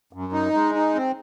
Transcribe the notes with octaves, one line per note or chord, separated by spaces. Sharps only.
F#2
D#4
G#3
D#4
C4